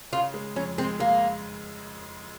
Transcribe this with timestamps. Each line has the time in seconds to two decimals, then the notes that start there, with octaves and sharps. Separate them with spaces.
0.13 C#3 F4
0.34 G#3
0.56 F2 C#4
0.78 G#3 C4
1.00 G#3 A#3